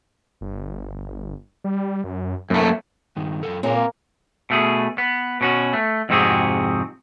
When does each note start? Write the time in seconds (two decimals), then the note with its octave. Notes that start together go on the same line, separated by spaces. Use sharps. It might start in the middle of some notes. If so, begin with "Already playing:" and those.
0.41 G1
1.64 G3
2.04 F#2
2.50 F#2 A3 A#3
3.16 G2 D#3
3.43 F#2 C#3 A4
3.63 A#2 C#3 C4 A#4
3.75 A#3
4.50 B2 A3 G#4
4.98 B3
5.41 B2 C#4 F#4
5.73 A3
6.09 F2 G#2 C3 C4 F#4 G#4